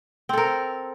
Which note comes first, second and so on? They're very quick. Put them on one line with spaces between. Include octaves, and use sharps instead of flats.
C4 A4 A#4